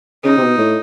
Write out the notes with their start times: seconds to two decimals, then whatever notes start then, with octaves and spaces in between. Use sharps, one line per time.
0.24 C#3 D#4
0.37 C3
0.41 B2
0.58 A2